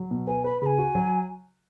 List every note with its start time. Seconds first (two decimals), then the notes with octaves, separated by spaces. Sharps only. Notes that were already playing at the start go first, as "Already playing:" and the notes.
Already playing: F#3
0.11 B2
0.27 B4 G#5
0.44 B4 B5
0.62 C#3 G#5 B5
0.78 F#4
0.95 F#3